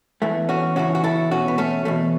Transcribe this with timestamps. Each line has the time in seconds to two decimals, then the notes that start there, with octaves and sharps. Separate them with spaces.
0.22 E2 E3 A3
0.49 C#4 F#4
0.76 E2 C#3 E3 C#4 F#4
0.95 F#4
1.04 E4 A4
1.31 E2 B2 C#4 F#4
1.48 B3
1.58 A3 C#4
1.85 E2 B2 A3